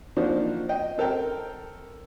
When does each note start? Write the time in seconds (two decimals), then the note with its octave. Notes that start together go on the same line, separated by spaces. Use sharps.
0.17 F3 A#3 C4 D4 D#4 F#4
0.69 D#5 G5
0.98 C4 A4 A#4 G5